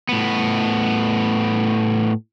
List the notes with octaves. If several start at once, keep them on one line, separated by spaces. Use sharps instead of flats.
A2 B3